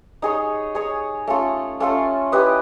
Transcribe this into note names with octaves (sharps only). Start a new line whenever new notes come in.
D#4 G#4 C#5
D#4 G#4 C#5
A3 C#4 F4 A4
A3 C#4 F4 A4
E4 G4 B4 D#5